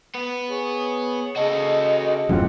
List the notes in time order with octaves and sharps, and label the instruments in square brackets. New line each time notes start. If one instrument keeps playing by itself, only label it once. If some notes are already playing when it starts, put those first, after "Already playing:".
[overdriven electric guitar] B3
[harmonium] G#4 C#5
[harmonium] C#3 [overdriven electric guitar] F#4 A4 [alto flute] D#5
[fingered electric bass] E1 F#2 A2 [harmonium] C4 F4 G4 [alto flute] F#5